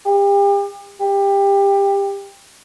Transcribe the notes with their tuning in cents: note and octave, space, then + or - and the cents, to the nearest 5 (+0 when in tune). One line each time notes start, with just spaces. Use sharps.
G4 +35
G4 +20